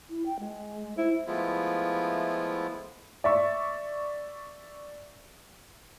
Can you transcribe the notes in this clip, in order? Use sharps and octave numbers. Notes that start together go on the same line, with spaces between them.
E4
G5
G#3
E4 C5
F3 G#3 A3 B3 E4 F4
D5 E5 C#6